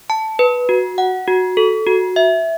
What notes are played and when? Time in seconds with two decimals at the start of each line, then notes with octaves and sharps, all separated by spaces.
0.10 A5
0.39 B4
0.69 F#4
0.98 F#5
1.28 F#4
1.57 A4
1.87 F#4
2.16 E5